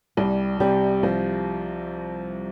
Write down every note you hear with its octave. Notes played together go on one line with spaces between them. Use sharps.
C2 G3
C3 G3
C2 F3